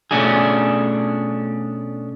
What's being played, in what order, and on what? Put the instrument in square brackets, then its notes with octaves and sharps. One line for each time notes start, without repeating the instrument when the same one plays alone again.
[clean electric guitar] B2 A3 C#4 D4 F4 G#4